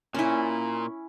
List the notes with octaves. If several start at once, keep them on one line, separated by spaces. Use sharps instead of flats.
A#2 C#4 E4